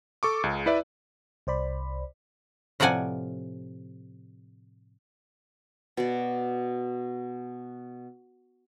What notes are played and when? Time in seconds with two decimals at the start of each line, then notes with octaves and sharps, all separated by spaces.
0.23 A4 C#6 D6
0.44 C#2 C#3
0.66 E4 B4 D5 E5
1.47 C2 C5 D5 B5
2.80 A2 C3 F3 D5 F#5 G#5
5.97 B2 D5